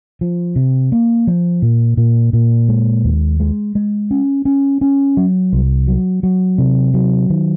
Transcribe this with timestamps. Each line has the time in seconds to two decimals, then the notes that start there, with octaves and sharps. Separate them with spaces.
0.21 F3
0.56 C3
0.92 A#3
1.27 F3
1.62 A#2
1.97 A#2
2.33 A#2
2.69 G#3
3.04 D#2
3.40 G#3
3.75 G#3
4.11 C#4
4.45 C#4
4.81 C#4
5.17 F#3
5.53 C2
5.87 F#3
6.23 F#3
6.58 C3
6.94 F#3
7.30 D#3